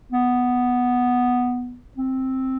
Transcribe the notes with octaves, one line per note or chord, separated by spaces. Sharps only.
B3
C4